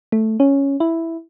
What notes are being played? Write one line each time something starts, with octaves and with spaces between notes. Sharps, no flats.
A3
C#4
E4